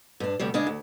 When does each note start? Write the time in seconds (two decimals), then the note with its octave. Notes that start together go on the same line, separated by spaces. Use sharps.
0.20 G2 D4
0.40 D2 C3 G3
0.54 C#3 G#3 D4
0.67 D2